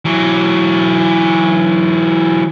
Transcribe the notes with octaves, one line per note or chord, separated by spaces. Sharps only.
E3 F#3